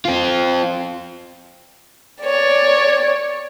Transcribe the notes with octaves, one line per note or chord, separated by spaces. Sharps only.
C4 F4
C#5 D5